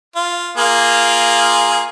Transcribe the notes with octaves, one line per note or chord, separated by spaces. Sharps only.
F4
A#3 F4 G#4